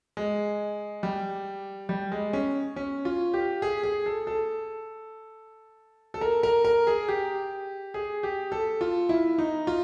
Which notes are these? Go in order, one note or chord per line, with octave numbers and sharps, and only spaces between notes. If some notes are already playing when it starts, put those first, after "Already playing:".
G#3
G3
G3
G#3
C#4
C#4
F4
G4
G#4
G#4
A4
A4
A4
A#4
A#4
A#4
G#4
G4
G#4
G4
A4
F4
E4
D#4
F4